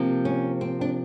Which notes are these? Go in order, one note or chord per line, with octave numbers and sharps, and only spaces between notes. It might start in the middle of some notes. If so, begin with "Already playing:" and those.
Already playing: C3 F3 A#3
C#4
C4
D4